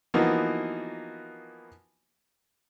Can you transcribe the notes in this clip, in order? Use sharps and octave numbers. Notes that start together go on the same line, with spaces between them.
E3 F3 A#3 B3 D#4 F#4